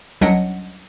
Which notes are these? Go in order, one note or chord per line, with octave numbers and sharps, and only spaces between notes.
C2 F#3 C#4 D4 D#5 F#5